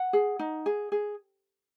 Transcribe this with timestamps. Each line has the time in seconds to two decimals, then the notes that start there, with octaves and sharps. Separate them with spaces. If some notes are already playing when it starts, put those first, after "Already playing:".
Already playing: F#5
0.13 G#4
0.39 D#4
0.66 G#4
0.92 G#4